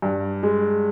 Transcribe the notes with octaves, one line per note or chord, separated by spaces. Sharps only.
G2
G#3